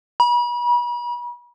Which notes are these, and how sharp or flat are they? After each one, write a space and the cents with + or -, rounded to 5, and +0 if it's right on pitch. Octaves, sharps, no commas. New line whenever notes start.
B5 -40